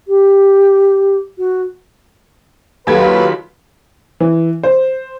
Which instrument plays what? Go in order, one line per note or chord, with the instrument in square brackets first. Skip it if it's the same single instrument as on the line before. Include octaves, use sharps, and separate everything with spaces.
[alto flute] G4
F#4
[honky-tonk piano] D#2 A4 G#6 [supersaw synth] F#3 F4 B5 [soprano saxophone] B4
[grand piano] E3
C5